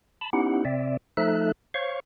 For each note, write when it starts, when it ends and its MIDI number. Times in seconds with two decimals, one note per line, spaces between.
0.21 0.30 81
0.21 0.30 83
0.33 0.64 59
0.33 0.64 61
0.33 0.64 63
0.33 0.64 64
0.33 0.64 67
0.33 0.64 78
0.65 0.97 48
0.65 0.97 60
0.65 0.97 74
0.65 0.97 76
1.17 1.52 53
1.17 1.52 57
1.17 1.52 63
1.17 1.52 69
1.17 1.52 76
1.17 1.52 90
1.74 2.00 72
1.74 2.00 73
1.74 2.00 77
1.74 2.00 85